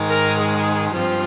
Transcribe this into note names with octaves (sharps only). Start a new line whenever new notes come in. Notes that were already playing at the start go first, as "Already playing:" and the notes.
Already playing: G#2 D#3 G#3
A#4
G#4
G2 F3 C4 F4